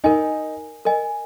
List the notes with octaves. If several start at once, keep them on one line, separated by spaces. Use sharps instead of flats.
D#4 A#4 D#5 G#5
A#4 D#5 G#5